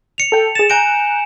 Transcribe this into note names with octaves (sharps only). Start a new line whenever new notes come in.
C#7 F7
A4 G5
G#4 A6 E7
G#5 A#5 F#6 G6 D7